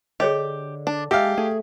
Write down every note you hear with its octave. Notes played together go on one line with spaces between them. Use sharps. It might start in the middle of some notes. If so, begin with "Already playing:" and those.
D3 G4 G#4 C#5 D#5
D4
G#3 G4 A4 E5 F5
A3 G#4